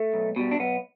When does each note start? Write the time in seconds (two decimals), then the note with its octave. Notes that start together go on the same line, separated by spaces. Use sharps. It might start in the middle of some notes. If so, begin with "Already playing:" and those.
Already playing: A3
0.14 B1
0.36 B2 G3
0.51 D4
0.59 B1 B3